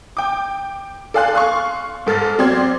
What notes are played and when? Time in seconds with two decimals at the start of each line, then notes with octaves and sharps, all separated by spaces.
0.17 G5 D6
1.14 A4 D5 F5 G#5 C6 F#6
1.35 F5 C6 C#6
2.07 G#2 A4 F6 A6
2.38 F#3 C4 D5 C6 G#6